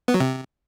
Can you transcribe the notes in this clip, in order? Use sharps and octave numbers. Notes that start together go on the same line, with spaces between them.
B3
F#3
C3